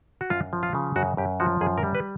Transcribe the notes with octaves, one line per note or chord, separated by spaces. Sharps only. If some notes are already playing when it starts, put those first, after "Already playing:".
F#4
F#2 F4
F3
F4
C#3
F#2 F#4
F#2 G4
F3 F#4
F#2 G#4
A#4
G3
B4